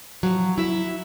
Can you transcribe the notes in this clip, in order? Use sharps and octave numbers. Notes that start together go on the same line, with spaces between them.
F3 F#3
E4 E5